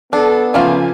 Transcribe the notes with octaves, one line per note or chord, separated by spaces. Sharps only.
B3 D4 A4
C#3 F3 A3 A#3 F4 G#5